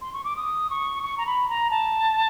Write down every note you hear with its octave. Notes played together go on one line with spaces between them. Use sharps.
C6
C#6
D6
D#6
C#6
C#6
A#5
B5
A#5
A5